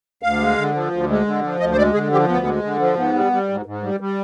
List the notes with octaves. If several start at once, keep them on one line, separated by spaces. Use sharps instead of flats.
D2 F5
G#3
D3
F3
D2
G#3
D3
F3
D2 D#5
C5
G#3 D5
D3 G#4
F3 G4
D2 B3
G#3
D3
F3
G#2 B3
G3
G3
G#2
G#2
G3
G3